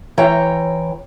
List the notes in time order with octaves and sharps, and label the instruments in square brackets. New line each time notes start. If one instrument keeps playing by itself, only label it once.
[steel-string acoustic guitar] E3 C#5 G5 A#5